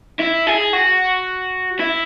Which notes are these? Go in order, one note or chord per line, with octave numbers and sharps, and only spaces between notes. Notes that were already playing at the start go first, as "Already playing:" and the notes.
E4
G#4
F#4
E4